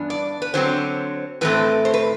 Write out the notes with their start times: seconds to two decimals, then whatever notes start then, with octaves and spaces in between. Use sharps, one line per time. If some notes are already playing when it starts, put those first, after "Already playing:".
Already playing: G2 E3 B3 D4
0.10 D5
0.42 B4
0.54 D3 F#3 C4 C5
1.41 A2 E3 A3 C4 B4
1.85 C5
1.94 B4